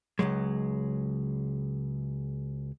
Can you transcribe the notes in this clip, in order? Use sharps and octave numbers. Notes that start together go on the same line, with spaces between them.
C#2 G2 F#3 G#3